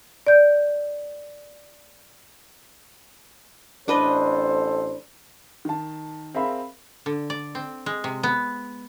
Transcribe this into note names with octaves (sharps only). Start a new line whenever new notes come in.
D5 G6
A1 D4 A4 B4 C5 D#5
D#3 A5
C4 G#4 A#4 E5 F5 B5
D3
D5
C4
G#3
C3
B3